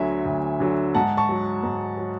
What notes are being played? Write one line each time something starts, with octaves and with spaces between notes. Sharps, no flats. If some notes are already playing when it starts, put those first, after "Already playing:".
Already playing: D2 D3 F#3 E5 G#5
D2
D3 F#3
G#2 F#5 A5
A5 C#6
F#3
G#2
F#3